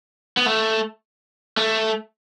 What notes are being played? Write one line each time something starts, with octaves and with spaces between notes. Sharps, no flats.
B3
A3
A3